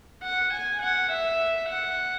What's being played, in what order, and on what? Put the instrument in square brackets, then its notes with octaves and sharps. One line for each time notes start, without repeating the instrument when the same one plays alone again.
[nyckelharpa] F#5
G#5
F#5
E5
F#5